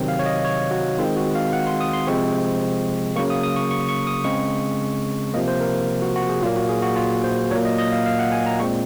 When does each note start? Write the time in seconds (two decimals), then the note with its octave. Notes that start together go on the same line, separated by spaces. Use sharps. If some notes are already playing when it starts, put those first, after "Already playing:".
Already playing: C3 D#3 F#3 C4
0.08 F5
0.19 C#5
0.26 D#5
0.45 C#5
0.71 F#4
0.98 D#3 G#3 C4 F4
1.16 F#4
1.35 F5
1.53 F#5
1.67 C6
1.80 D#6
1.93 C6
2.07 C3 F3 G#3 C4 C#6
3.16 C#3 F#3 A#3 C#6
3.30 D#6
3.43 D#6
3.56 C#6
3.71 C#6
3.89 C#6
4.07 D#6
4.24 C#3 G#3 C4 C#6
5.33 C3 F3 A#3 D#5
5.48 C5
5.61 A#4
6.02 F#4
6.16 F#4
6.29 G#4
6.42 A#2 F#3 A#3 F4
6.56 F#4
6.69 G#4
6.82 F#4
6.96 F4
7.24 C5
7.51 A#2 F#3 A#3 C#5
7.65 D#5
7.78 D#5
7.92 F5
8.06 F5
8.19 F#5
8.32 G#5
8.46 A#5
8.59 A#2 G#3 C4 C#6